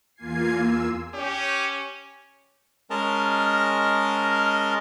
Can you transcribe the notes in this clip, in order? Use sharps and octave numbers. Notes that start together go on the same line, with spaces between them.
E2 A#3 F4 G#5 G#6 C7
E6
C#4 G4
G#3 C#4 A#4 D#5 A5 F6